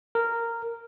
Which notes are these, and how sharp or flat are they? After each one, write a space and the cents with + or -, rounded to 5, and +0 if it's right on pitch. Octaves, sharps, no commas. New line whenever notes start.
A#4 -10